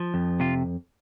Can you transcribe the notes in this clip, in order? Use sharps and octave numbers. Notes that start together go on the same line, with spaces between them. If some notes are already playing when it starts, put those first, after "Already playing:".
Already playing: F3
F2
C3 F4